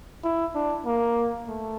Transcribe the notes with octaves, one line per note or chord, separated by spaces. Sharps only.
E4
D4
A#3
A3